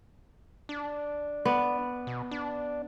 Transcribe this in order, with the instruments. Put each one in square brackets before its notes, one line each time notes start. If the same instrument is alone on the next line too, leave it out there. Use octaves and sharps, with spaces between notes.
[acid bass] D4
[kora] B3 D5
[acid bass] B2
D4